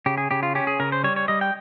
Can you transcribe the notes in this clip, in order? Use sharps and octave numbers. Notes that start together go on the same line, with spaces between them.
C#3 G4
G#4
C#3 G4
F4
C#4 G4
G#4
C#3 A#4
C5
G3 C#5
C#5
G3 D#5
G5